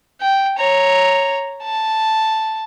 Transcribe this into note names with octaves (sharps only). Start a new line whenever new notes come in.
G5
C#5 A#5
A5